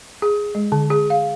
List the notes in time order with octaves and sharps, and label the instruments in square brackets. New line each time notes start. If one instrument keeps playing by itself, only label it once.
[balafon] G#4
G#3
D3
G#4
F5